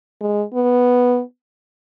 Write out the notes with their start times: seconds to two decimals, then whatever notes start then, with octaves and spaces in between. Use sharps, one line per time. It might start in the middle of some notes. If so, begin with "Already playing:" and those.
0.21 G#3
0.54 B3